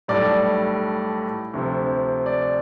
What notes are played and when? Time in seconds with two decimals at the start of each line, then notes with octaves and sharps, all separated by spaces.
0.08 B1 A2 G3 D5
1.54 D2 C3 F3
2.26 D5